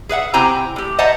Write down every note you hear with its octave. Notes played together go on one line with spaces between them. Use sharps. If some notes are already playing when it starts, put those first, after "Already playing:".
G#4 B4 E5 F#5
C3 C4 E4 G4 G#5 A#5
A2 G4
C5 D#5 E5 F#5 A5 A#5